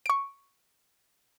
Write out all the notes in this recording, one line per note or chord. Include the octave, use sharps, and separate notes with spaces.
C#6 D7